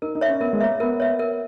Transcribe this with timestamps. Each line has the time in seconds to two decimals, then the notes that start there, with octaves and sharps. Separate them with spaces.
0.02 D#4 A#4
0.15 D#4
0.21 C#5 E5
0.28 C#4
0.41 B3 A#4
0.53 G#3
0.60 A#3 C#5 E5
0.80 B3 A#4
1.00 C#5 E5
1.19 A#4